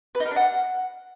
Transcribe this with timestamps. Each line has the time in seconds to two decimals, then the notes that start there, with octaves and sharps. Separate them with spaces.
0.15 B4
0.20 D#4
0.26 A#4
0.31 D4
0.36 F#5